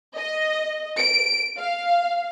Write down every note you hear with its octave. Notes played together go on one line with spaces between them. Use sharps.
D#5
D7
F5